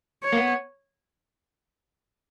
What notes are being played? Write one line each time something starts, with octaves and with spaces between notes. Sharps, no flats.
C#5
A#3
B3